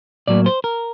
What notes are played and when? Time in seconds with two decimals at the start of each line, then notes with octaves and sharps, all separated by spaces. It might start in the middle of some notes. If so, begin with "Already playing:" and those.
0.28 A2 F#3 A#3 D5
0.46 C5
0.64 A#4